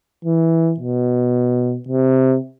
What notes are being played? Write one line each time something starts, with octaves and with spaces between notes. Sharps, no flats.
E3
B2
C3